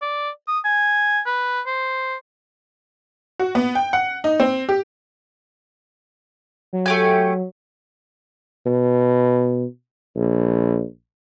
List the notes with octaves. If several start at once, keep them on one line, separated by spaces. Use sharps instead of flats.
D5
D#6
G#5
B4
C5
F#4
B3
G5
F#5
D#4
C4
G4
F#3
A3 G4 G#5
B2
A#1